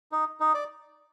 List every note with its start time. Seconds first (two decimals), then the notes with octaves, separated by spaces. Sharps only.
0.12 D#4
0.40 D#4
0.54 D5